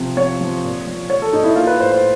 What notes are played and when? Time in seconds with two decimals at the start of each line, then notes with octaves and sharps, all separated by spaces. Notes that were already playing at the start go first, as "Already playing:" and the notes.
Already playing: C3 F3
0.17 F3 C#5
0.41 F3
0.64 A#2
0.87 F3
1.10 F3 C#5
1.22 A4
1.33 A#2 D#4
1.44 E4
1.56 A#3 F4
1.67 B4
1.80 A2 C5
1.91 C5